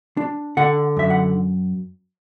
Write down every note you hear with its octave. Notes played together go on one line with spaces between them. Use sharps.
D4
D3 F#5
F#2 E5
F#5